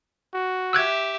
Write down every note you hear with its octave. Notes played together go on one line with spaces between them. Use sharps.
F#4
G4 E5 E6 F#6 G#6